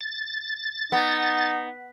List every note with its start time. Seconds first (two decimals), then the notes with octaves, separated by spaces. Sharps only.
0.01 A6
0.92 B3 D#4